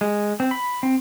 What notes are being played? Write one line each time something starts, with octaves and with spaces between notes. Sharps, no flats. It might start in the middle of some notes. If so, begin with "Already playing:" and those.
G#3
C4
B5
C4